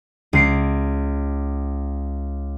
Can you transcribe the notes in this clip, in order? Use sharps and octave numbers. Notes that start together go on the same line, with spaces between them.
C#2 C7 D7